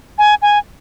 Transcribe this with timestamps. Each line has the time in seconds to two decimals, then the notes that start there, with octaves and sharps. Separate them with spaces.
0.18 G#5
0.42 G#5